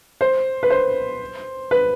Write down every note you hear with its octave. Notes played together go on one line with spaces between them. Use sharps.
C5
B4
C5
B4